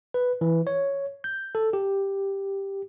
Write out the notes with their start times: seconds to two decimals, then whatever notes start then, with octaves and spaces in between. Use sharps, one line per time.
0.14 B4
0.41 E3
0.67 C#5
1.24 G6
1.55 A4
1.73 G4